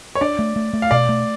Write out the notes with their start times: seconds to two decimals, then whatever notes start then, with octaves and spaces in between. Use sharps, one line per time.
0.15 C#5
0.21 D4 D5
0.39 A3
0.56 A3
0.74 A3
0.82 F5
0.91 B2 D5
1.09 A3